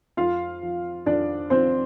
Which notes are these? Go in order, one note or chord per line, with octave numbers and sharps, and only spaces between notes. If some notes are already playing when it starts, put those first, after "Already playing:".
F2 F4 F5
F3
F2 D4 D5
F3 C4 C5